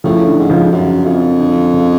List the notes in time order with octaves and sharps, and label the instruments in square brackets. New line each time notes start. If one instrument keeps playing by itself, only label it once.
[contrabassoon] A2 [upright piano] C#3 F3
[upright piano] D3
[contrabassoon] G#2
[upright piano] C#3 F3
[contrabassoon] F#2
F2
[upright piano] D3
D3
C#3